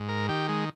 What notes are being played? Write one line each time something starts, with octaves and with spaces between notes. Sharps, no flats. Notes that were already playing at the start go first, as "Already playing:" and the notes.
Already playing: G#2
A#4
D#3 G4
G#3